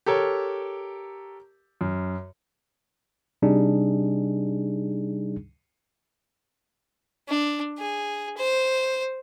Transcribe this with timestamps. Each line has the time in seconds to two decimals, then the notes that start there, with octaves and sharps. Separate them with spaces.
0.06 G4 A4 A#4 C#5
1.81 F#2
3.42 C3 G3 D4 D#4 G#4
7.28 D4
7.78 G#4
8.37 C5